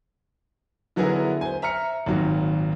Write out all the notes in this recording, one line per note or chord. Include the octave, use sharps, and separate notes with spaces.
D3 F#3 B3 E4 G#4 A#4
C5 G#5
E5 A#5 F6 C#7
G#1 A#2 D#3 F#3